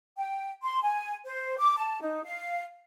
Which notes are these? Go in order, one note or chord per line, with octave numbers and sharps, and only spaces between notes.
G5
C6
G#5
C5
D6
A5
D#4
F5